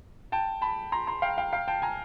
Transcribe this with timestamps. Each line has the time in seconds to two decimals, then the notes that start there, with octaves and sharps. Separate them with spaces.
0.32 G5 A5
0.62 A5 B5
0.92 A#5 C6
1.07 A#5 C6
1.22 F5 G5
1.38 F5 G5
1.52 F5 G5
1.68 G5 A5
1.82 G#5 A#5